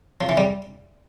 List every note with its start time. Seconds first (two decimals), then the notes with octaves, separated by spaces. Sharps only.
0.21 F3
0.29 E3
0.37 G3